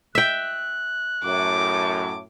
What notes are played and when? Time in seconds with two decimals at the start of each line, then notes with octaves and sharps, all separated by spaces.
0.15 E5 G5 F#6
1.24 F#2 A2 D6